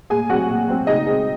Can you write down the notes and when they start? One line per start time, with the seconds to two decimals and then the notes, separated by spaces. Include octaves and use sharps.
0.10 A#2 G#4 G#5
0.29 F#3 C4 F#4 F#5
0.49 A#2
0.68 F#3 C4
0.87 C#3 D#4 D#5
1.07 G#3 C4